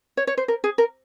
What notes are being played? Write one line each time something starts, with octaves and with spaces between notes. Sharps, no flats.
C#5
C#5
C5
A#4
G#4
A#4